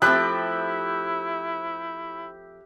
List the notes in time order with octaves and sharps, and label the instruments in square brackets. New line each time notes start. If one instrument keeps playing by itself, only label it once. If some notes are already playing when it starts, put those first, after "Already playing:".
[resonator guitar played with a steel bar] F3 A3 C4 [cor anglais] E4 [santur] G4 E5 B5 [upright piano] F#6